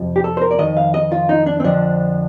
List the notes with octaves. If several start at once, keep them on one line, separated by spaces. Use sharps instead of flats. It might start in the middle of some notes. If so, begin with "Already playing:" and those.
Already playing: F2 C3 F3
G4
A4
C5
A#4
D5
F2 D#3 D#5
F5
D#5
F4
D#4
D4
C4
F2 D3 F3 D4